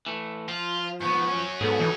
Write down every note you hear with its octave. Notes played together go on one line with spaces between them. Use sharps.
E3 A3
F3 F4
G#2 B3 C#6
F#3 C#4
G#2 B3 G#4 A4
E3 D#4